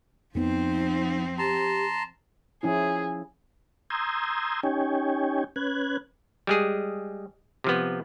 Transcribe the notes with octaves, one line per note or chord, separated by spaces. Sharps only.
F2 F3 B3 C4 D#4
G4 A5 A#5 C6
F3 C#4 E4 G#4
A#5 C6 D#6 E6 G6 G#6
C#4 D#4 G4 C#5 G5 G#5
C#4 B4 F#6 G#6
G3 G#3 G#4
C3 F3 B3